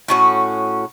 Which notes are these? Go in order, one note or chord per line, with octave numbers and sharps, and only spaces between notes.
A2 C#4 F#4